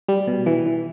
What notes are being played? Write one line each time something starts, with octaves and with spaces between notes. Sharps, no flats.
G3
B2
E3
E3